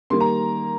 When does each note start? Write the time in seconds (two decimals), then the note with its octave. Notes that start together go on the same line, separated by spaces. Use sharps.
0.10 D#3 G3 A#3 C6
0.20 A#5